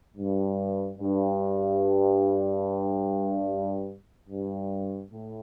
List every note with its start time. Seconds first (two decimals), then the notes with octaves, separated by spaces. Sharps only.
0.17 G2
0.98 G2
4.29 G2
5.11 A2